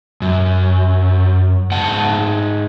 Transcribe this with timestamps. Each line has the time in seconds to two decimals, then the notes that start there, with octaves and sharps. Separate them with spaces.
0.22 F#2
1.71 G#2 F#5 A5